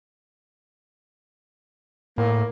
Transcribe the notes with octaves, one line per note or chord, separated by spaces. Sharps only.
A2 A#3